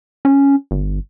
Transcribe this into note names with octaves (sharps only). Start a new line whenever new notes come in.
C#4
G1